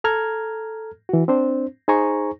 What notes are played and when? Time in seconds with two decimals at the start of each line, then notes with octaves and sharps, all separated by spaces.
0.04 A4 A#5 F6 G#6
1.09 E3 F#4
1.28 C4 D4 C5
1.88 D#4 G#4 C5 G#5 A#5 C#6